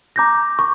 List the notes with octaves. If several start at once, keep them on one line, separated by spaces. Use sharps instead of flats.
A#5 D6 G6 A#6
C#6